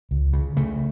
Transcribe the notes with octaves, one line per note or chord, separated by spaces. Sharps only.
C#2
C#3
C#3 A3